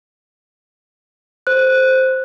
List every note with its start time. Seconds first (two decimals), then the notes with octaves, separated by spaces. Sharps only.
1.47 C5 F#6